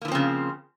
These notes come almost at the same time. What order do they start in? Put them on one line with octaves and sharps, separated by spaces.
A#3 E3 F3 C4 C#3